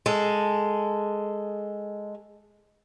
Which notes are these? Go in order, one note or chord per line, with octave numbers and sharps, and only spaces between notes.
G#3 A4